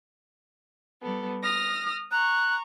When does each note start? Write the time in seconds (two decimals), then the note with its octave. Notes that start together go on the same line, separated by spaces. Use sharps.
1.01 G3 B3 A4
1.42 D#6 F6 A#6
2.12 A#5 C#6 F#6